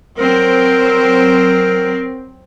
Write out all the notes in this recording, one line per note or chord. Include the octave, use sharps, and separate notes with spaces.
F#3 C4 A#4